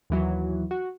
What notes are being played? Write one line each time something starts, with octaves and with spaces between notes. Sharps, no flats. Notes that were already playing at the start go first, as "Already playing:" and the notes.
D#2 E3 F#3
F#4